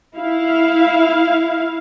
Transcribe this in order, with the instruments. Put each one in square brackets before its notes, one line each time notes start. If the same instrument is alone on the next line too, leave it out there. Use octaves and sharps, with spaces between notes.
[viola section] E4 F5